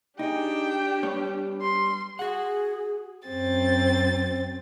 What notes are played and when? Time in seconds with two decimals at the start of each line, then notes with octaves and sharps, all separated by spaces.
0.19 D4 D#4 G4 G#4 G5
1.03 G3 B3 C#5
1.62 C6
2.19 F#4 G#4 F#5
3.27 F#2 C4 A6